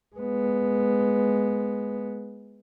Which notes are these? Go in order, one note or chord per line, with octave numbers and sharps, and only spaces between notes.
G#3 B3